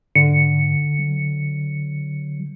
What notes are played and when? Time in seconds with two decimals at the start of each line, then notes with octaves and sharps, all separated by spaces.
0.15 G#2 D3 C#7
0.99 F#3